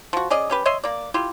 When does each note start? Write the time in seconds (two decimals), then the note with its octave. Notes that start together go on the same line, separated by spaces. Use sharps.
0.13 F3 F#4
0.30 C#4 G#4 D5 D#5
0.50 C#4 G4 B4
0.65 C#5 D#5 E5 C6
0.84 A#3 D5
1.14 E4 F4 G4